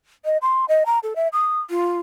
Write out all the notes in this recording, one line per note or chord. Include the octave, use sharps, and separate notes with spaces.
D#5
C6
D#5
A#5
A4
E5
D#6
F4